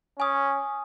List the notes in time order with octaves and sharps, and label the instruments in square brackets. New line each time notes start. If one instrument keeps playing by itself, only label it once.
[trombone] C#4 [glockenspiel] G#5 D#6